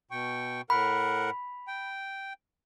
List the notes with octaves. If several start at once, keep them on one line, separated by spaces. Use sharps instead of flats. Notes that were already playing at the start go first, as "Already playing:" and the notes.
B2 G5 C#6
A2 A#4 F#5 B5
G5